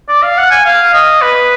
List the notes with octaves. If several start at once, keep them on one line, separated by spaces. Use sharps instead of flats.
D5
F5
F#5
G#5
F5
D#5
B4